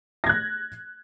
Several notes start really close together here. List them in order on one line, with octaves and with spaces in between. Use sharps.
A#6 G#6 F#6